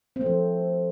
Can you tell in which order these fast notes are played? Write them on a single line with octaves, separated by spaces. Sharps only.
C4 A3 F3